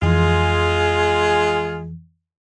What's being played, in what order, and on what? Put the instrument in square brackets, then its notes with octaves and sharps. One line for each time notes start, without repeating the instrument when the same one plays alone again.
[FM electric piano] F2 E3 [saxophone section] G#3 F4 G#4